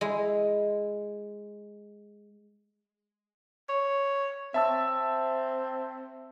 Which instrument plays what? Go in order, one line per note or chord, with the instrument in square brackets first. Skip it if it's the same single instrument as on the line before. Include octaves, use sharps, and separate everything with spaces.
[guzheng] G#3 E4
[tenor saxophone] C#5
[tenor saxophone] C4 [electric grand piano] E5 A5 E6